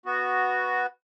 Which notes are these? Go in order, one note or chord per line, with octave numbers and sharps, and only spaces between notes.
B3 F#4